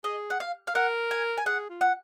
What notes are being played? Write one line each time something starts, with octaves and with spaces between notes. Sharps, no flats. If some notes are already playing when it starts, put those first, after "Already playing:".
G#4 D#5
F#5
F5
F5
A#4 F#5
G#5
G#5
G#4 F#5
F4
F#5